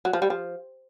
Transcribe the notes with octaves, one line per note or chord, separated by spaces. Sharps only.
F#3
F3
G3
F3